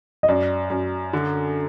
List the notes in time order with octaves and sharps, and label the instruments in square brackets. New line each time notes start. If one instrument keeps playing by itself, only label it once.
[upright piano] D#5
[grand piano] F#2 [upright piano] D5
[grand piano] F#2
D3